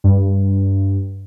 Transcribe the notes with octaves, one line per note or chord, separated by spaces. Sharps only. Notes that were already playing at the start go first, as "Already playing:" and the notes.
G2